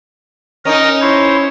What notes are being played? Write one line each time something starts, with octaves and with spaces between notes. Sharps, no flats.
C#4 D#4 A#4 D#5
E4 C5 C#5